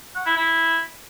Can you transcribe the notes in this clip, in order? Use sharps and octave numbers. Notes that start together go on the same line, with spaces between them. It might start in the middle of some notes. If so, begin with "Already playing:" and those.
F#5
E4
E4